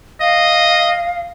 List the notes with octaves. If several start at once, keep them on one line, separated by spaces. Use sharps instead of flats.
D#5 F5